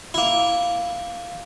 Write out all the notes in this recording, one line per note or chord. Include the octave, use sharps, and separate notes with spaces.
A#3 E4